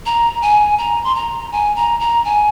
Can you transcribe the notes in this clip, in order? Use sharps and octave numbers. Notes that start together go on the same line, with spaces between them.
A#5
G#5
A#5
C6
A#5
G#5
A#5
A#5
G#5